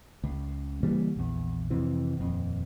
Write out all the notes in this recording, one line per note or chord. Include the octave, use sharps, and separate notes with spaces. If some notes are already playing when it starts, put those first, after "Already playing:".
C#2
C#3 E3 G3 A#3
A#1 E2
F2 C3 E3
D#1 F2